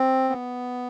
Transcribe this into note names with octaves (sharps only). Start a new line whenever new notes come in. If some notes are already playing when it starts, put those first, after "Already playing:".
Already playing: C4
B3